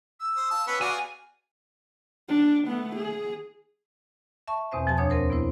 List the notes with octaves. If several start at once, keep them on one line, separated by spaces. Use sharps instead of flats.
E6
C5 D#6
F4 A5
B3 C#4 B4 B5 C#6
B3 F#4 G#4 D5 F5
D4
A3 B3
G#4
E5 A5 C#6
E2 B2 C4 C5 E5
E2 F3 G4 A5
D2 D4 C#5 D#6 G#6
C4 A#4 C5
B3 C4 E4 C5